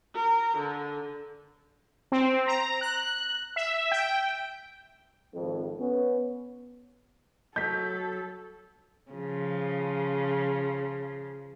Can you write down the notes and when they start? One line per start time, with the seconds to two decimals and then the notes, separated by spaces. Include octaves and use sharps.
0.14 A#4
0.57 D3
2.12 C4
2.47 A#5
2.81 F#6
3.56 E5
3.91 G5
5.35 G#1 F2
5.79 B3 C#4
7.56 F#3 A4 G6 B6
9.11 C#3 F3